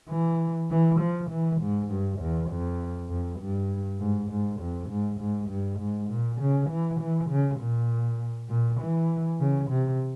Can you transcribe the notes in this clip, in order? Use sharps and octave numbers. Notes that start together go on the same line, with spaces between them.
E3
E3
F3
E3
G#2
G2
E2
F2
F2
G2
G#2
G#2
F2
G#2
G#2
G2
G#2
A#2
C#3
E3
E3
C#3
A#2
A#2
E3
C#3
C3